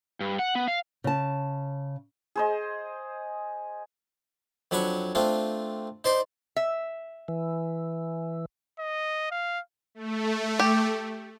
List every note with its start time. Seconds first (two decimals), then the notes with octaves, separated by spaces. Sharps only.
0.20 G2
0.39 F#5
0.55 B3
0.68 F5
1.04 C#3 A5
2.36 G#4 C5 D#5
4.71 F2 F#3 D4 B5 C#6
5.15 A3 C4 D4 F4
6.04 D#4 C5 D5 C6
6.56 E5
7.28 E3
8.79 D#5
9.31 F5
9.95 A3
10.59 G4